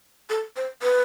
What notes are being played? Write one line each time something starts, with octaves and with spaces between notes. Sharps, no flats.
A4
C5
B4